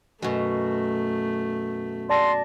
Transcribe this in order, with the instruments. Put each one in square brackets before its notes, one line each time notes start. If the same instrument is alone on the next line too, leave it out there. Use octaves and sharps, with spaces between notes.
[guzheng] F#2 B2 [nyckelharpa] A3
[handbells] D5 A5 A#6 [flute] C6